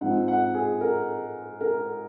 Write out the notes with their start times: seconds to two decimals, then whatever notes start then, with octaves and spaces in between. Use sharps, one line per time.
0.01 G#2 F3 C4 D#4 F#5
0.28 F#5
0.54 G#4
0.81 A#4
1.61 A#4